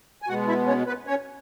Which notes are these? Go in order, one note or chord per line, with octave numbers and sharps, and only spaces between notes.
G#5
B2 G#3 B3 F#4 F#5
E4 E5
C#4 C#5
B3 B4
C#4 C#5